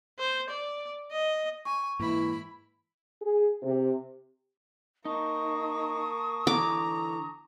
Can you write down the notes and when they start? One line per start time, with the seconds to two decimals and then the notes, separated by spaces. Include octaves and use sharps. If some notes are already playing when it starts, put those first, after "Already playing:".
0.19 C5
0.50 D5
1.12 D#5
1.65 G#5 C#6
1.99 G#2 E3 A#3 E4 B5
3.21 G#4
3.63 C3
5.05 A#3 D#4 A5 C#6 D#6
6.47 D3 E3 A#5 D6